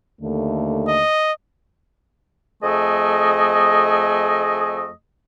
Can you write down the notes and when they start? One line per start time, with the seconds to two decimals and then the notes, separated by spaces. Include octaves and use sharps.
0.21 D#2 D3 A3
0.87 D#5
2.62 F2 A3 G#4 D#5